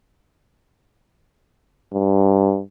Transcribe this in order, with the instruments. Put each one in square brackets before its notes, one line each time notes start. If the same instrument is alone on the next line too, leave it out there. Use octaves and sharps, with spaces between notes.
[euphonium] G2